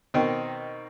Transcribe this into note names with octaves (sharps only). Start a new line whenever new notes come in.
B2 D#3 C4